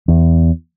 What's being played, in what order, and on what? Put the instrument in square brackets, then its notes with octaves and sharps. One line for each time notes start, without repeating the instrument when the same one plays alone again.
[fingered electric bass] E2